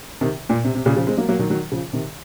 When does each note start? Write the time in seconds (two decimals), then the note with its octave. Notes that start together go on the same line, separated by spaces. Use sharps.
0.21 C3 D#3
0.49 A#2
0.64 C3
0.75 C3
0.86 A#2 C#3
0.96 C#3 F3
1.07 G#3 C4
1.17 F#3 A#3
1.29 F#3 A#3
1.39 D#3 F#3
1.50 D#3 F#3
1.72 C#3 F3
1.93 C3 D#3